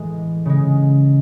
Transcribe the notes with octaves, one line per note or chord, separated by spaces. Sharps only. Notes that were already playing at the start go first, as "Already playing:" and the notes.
Already playing: A2 E3 G#3
C#3 G#3